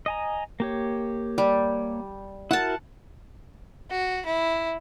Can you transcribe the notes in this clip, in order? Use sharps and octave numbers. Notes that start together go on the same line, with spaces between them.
D#5 G#5 A#5
A#3 G4 C#5
G3
E4 F#4 A#4 F#5 A5
F#4
E4